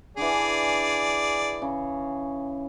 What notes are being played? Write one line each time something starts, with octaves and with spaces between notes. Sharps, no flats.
D3 E3 G#4 D5
C#3